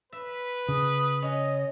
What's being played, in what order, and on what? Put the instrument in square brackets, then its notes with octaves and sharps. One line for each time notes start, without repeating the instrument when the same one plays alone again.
[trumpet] B4 [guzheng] E5
[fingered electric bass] C#3 [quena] D#6
[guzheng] C#4 [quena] D#5